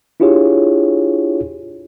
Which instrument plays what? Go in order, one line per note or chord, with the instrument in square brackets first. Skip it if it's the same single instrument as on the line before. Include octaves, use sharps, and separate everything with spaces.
[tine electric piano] D4 E4 F4 G4 G#4 C#5